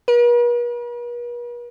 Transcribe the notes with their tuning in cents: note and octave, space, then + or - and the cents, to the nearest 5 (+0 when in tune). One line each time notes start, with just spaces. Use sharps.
B4 -45